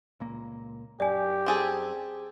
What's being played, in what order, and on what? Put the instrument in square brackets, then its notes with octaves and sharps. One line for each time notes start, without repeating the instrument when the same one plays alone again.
[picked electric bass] C#2 A#2 A#3
[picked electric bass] F#2 [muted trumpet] G4 [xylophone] D5 G#5
[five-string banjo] C4 G#4 A4